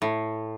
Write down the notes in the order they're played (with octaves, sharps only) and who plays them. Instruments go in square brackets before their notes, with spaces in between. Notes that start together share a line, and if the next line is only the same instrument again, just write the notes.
[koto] A2